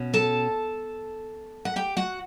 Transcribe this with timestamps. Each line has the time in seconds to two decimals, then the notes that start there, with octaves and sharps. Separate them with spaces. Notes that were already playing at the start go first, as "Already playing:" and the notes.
Already playing: B2 C#4
0.14 A4 A5
1.65 F#5
1.76 G4 G5
1.97 F#4 F#5